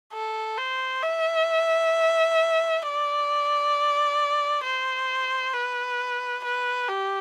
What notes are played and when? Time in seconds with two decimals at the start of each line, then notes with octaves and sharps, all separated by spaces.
0.14 A4
0.58 C5
1.03 E5
2.83 D5
4.63 C5
5.53 B4
6.44 B4
6.89 G4